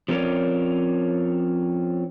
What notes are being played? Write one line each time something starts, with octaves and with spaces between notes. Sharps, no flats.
F3 C4 C#4 A#4 C#5 D5